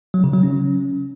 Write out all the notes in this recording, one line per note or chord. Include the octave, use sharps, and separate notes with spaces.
F#3
C#3
F#3
C#4